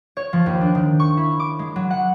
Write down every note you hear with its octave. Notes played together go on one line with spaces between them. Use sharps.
C#5
F3
D#2
D4
D#3
C#6
E4
D6
G#3
F#3
F#5